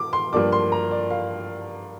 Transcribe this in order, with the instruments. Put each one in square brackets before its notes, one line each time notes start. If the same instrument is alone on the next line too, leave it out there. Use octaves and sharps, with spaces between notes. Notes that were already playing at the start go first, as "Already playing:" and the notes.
Already playing: [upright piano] D6
C6
G2 F3 A#3 D4 D6
C6
A#5
D5
F5